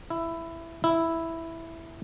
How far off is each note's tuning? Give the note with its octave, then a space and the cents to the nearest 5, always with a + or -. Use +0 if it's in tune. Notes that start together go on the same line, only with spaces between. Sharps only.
E4 +10
E4 +0